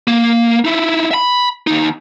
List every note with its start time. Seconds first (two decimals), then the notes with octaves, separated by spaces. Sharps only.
0.07 A#3
0.65 D#4 E4
1.11 E5 B5
1.67 D#2 D#4